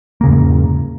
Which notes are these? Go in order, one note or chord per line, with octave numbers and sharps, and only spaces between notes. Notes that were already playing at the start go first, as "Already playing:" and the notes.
E2 G#2 C#3 A#3